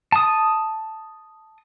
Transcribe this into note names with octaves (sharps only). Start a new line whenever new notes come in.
A5 D#6